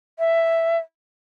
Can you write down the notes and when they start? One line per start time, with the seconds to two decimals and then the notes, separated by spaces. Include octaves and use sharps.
0.19 E5